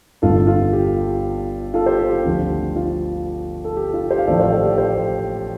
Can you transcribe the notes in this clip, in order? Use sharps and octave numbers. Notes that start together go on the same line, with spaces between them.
G1 G2 D3 F4 A4
F4
G4
F4 A4
G4 C5
G4
G4
D2 D3 F3
F4
A4
G4
F4
G4 C5
F5
A1 A2 F3 A4 D5
C5 F5
A4 D5
G4
G4 C5